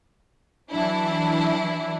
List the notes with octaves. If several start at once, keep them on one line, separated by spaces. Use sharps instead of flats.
E3 F#3 D4 E4